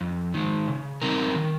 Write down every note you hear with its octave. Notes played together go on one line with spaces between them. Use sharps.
F2
D#3 G#3
C#3
G3 C4 D#4 A#4
D#3